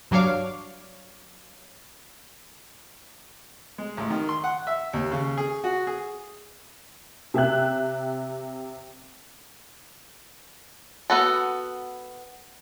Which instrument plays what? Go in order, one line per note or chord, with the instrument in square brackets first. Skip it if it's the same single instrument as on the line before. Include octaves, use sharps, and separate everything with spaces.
[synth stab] G2 F#3 D4 C#5 F5 D6
[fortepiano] G#3
A1
D#3
C6
F#5
E5
D#2
C#3
G#4
F#4
G#4
[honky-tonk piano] C3 E5 G5 F#6
[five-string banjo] B3 F#4 A4